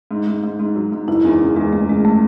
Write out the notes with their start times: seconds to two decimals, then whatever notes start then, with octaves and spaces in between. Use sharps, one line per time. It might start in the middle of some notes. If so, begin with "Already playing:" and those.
0.11 G#2
0.27 G#2
0.43 G#2
0.59 G#2
0.75 F#3
0.92 G#2
1.08 F#1 E4
1.24 E2 D#4
1.40 C#3 C#4
1.56 E2 G#3
1.73 F#1 A3
1.89 C#3 G#3
2.05 A3